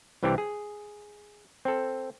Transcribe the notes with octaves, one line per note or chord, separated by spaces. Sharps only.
C2 E3 C4 D4 G4
G#4
C4 A4